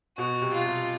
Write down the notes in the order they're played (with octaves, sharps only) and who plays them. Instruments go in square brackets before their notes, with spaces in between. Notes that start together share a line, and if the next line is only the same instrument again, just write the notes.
[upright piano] B2 [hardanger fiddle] F#4
[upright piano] C3
[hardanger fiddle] F4
[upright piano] C3